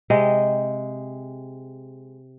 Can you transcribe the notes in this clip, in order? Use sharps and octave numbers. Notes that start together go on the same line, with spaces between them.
C3 G#3 D#5 G5